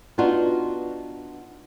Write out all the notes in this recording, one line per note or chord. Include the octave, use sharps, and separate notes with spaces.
B3 D4 D#4 F4 F#4